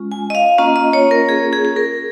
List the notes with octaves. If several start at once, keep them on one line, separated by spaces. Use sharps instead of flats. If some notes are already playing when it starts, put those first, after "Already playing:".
Already playing: G#3 C#4 F4
G#5
D#5
F5
A#3 C#4 F4 D#5
D#5
C#5
A#4
G#4
G#4
G#4
A#4